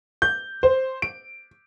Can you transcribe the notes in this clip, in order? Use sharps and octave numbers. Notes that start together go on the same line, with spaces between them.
G6
C5
D7